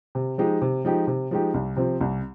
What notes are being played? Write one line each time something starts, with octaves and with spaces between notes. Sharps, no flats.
C3
F3 G#3 D#4 G4
C3
F3 G#3 D#4 G4
C3
F3 G#3 D#4 G4
C2
C3 F3 C4
C2